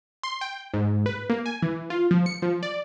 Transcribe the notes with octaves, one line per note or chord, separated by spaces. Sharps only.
C6
G5
G#2
B4
A#3
G#5
E3
F4
F3
C#7
F3
D5